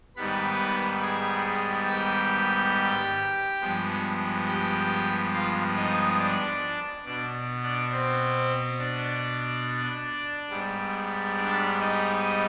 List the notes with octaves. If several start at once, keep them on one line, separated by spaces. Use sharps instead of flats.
G#2 D#3 G3 B3 B4 B5
G#4 G#5
G4 G5
G2 F3 G#3 B3
G4 G5
F4 F5
D#4 D#5
D4 D5
B2 B3 D4 D5
D4 D5
C4 C5
D4 D5
G#2 G3 B3
D4 D5
D#4 D#5